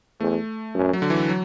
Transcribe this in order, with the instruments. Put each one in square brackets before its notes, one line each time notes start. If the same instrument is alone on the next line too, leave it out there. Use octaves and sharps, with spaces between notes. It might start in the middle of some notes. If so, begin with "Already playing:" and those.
[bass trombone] E2 [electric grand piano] A3
[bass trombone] F#2
[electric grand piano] F#3
D3
E3
F#3